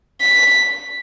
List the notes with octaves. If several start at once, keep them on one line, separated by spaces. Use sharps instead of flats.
B6